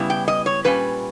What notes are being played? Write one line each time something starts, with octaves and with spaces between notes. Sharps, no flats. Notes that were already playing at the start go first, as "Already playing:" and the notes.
Already playing: C#3 G3 B3 E4
G5
D#5
C#5
A#2 G3 C#4 B4